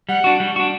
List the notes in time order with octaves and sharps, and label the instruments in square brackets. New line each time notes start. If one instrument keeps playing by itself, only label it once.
[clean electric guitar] G3 [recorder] F#5
[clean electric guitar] D4 F#4
G3
D4 F#4